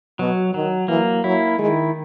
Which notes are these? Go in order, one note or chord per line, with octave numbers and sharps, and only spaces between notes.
B2 F#3
D#3 F#3
E3 A#3
F#3 E4
D#3 G#3